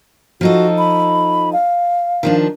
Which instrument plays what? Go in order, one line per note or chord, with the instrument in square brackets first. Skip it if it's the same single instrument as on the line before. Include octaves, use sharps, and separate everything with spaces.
[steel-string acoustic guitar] F3 D#4 A4 [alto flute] F#4
[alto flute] B5
F5
[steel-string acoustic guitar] D#3 F3 D4